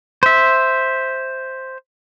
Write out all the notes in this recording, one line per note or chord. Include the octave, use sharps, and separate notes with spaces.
C5 E5